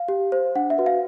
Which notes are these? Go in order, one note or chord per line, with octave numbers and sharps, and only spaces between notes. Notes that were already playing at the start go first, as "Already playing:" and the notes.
Already playing: F5
G4
C5
D4 F#5
E5
F#4 B4
F5